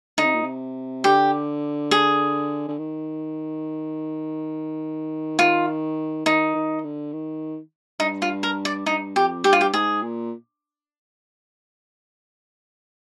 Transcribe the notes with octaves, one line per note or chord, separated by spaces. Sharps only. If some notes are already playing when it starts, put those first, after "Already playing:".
D3 D#4
C3
A#2
C3
D3 G4
G#4
D3
D#3
D#3 F4
D#3 D#4
D#3
D3
D#3
G2 D#4
F4
A#4
D5
G2 D#4
F2 G4
G2 G4
F4
G4
G#2 G#4
A#2